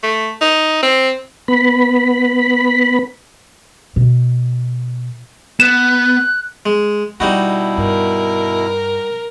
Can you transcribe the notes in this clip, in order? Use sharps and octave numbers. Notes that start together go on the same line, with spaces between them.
A3
D#4
C4
B3 B5
B2
B3 F#6 E7
G#3
B2 G3 B3 D#4 E4 F#4
G2 A#4